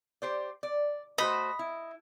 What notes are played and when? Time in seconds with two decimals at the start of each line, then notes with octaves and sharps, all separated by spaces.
0.22 G4 C5 D5
0.63 D5
1.18 A3 F#4 C5 D#5 B5
1.59 E4